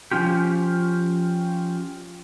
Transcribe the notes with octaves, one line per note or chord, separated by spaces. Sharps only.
F3 C#4 F4 G4